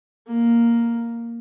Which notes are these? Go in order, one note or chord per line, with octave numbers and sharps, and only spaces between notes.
A#3